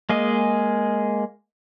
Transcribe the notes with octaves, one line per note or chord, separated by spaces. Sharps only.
G#3 A#3 G#4 D#5